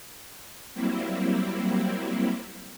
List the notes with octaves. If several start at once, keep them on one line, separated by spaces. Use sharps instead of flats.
F#3 G3 A#3 C4 E4